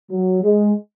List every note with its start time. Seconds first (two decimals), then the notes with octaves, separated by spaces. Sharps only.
0.11 F#3
0.43 G#3